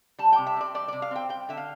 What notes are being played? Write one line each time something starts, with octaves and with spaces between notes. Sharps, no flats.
G3 A5
G5
C3
E5
C4 D5
G3 D5
C3 D5
F5
C4 G5
G3 G5
D3 E5
F5